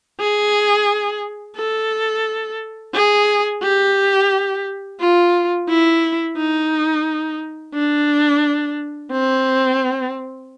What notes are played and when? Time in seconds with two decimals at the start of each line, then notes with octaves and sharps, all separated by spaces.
0.20 G#4
1.57 A4
2.94 G#4
3.63 G4
5.00 F4
5.69 E4
6.37 D#4
7.74 D4
9.11 C4